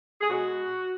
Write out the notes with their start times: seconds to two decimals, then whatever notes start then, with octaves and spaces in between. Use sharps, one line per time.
0.21 G#4
0.29 B2 G#3 F#4